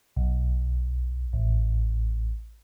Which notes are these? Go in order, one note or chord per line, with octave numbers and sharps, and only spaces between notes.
B1
A1